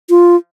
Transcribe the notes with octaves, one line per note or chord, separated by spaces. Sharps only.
F4